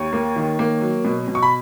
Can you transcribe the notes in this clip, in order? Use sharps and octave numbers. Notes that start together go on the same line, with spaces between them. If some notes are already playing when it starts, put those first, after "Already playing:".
Already playing: D#2 C#5 C#6
A#3
D#3
A#3
F#3
B2
B2
C#6
B5